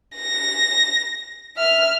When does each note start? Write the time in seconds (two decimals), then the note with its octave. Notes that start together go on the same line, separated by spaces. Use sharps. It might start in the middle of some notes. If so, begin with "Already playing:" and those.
0.16 A#6
1.57 E5 F6